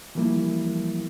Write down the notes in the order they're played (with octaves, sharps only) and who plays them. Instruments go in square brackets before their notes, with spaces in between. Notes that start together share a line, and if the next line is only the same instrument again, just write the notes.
[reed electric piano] E3 F3 G3 A#3 E4